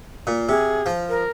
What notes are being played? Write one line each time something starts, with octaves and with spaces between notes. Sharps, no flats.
A#2
C3 G#4
F3
A#4